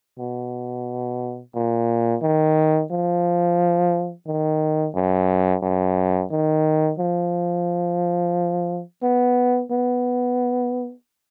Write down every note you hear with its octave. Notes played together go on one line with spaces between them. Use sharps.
B2
A#2
D#3
F3
D#3
F#2
F#2
D#3
F3
B3
B3